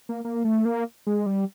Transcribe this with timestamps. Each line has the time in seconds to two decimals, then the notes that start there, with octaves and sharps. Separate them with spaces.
0.09 A#3
0.25 A#3
0.45 A3
0.65 A#3
1.07 G#3
1.26 G3